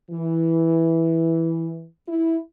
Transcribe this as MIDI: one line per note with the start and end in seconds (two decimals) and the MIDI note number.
0.10 1.84 52
2.08 2.37 64